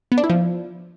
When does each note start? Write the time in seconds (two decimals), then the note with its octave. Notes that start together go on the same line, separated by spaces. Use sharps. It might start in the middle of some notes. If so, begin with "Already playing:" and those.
0.12 B3
0.18 D4
0.24 E4
0.30 F3